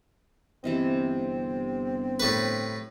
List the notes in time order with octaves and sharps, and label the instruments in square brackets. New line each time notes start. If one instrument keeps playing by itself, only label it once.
[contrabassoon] G1 [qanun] C3 E3 D#5 [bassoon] C4
[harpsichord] A2 B4